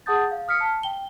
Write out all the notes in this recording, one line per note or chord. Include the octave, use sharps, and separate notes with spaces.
G#4 F#5 A5 D#6 G6 A6
F5
D#6 F6 B6 C#7
A5
G5 G7